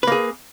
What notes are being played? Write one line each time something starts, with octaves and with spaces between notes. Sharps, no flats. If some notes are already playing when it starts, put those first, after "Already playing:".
A#3 G#4 B4